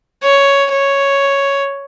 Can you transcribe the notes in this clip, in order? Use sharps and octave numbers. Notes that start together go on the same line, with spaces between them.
C#5
C#5